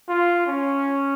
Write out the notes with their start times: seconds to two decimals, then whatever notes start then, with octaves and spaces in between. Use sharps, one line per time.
0.09 F4
0.47 C#4